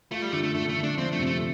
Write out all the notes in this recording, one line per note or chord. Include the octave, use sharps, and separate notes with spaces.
A3 F4
G3
D3 A3
A3
D3 A3
A3
D3
D4
F3 C4
A3
C3
A3